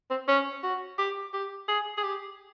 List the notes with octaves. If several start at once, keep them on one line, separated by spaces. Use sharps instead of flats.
C4
C#4
F#4
G4
G4
G#4
G#4
G4